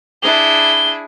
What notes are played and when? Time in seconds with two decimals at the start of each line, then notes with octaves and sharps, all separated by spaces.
0.23 D4 E4 G#4 G7